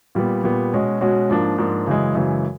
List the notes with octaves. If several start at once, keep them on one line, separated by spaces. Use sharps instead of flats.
A#2 G3 B3
A#2 G3 B3
B2 G#3 C#4 F#4
B2 G#3 C#4 F#4
G#2 F3 A#3 D4
G#2 F3 A#3 D4
F#2 C#3 E3 G#3
F#2 C#3 E3 G#3